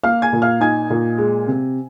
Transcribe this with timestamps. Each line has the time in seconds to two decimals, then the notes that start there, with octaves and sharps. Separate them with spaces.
0.03 A#3 F5 F6
0.22 G#5 G#6
0.33 A#2
0.42 F5 F6
0.60 D#4 G#5 G#6
0.90 A#2
1.18 G#3
1.47 C3